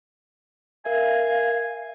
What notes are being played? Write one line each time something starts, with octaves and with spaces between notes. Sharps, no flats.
A#4 E5 F5 G#5